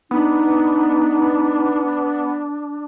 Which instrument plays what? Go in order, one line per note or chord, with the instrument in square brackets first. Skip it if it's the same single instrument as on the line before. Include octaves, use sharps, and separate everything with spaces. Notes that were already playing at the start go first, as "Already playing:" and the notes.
[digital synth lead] B3 [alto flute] D4 [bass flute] D#4